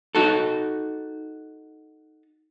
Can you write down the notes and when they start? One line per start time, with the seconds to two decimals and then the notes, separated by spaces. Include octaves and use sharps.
0.15 D#4 F#4 A4